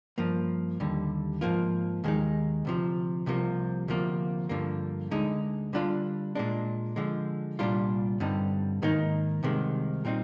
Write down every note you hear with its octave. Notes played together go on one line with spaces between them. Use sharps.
G2 F3 A#3
D#2 D3 G3
G#2 F3 A#3 F4
D#2 D#3 G#3 D#4
D2 C3 F3
C2 C3 F3 A#3
D2 C3 F3 A#3
G2 D3 F3 A#3
D2 D3 G#3 D#4
D3 G3 D4 F4
A#2 G#3 D4
D3 F3 G#3
C2 A#2 G3 D4 F4
G2 D3 G3 C4 D#4
G#2 D#3 A#3 D#4
C2 C3 D#3 G#3
A#2 G3 C4 D#4